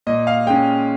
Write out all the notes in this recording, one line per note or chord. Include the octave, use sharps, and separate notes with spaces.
A#2 D#5
F5
G#3 C#4 G5